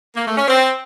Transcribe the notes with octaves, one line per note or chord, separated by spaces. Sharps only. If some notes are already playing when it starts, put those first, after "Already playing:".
A#3
A3
C#4
C4